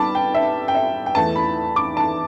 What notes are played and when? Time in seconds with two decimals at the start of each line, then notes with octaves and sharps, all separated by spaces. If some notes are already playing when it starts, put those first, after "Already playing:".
Already playing: G3 B3 A5 B5 D6
0.15 G5
0.35 E5
0.68 G5
0.75 E5
1.06 G5
1.15 E2 E3 A3 A5
1.36 B5
1.76 D6
1.97 A5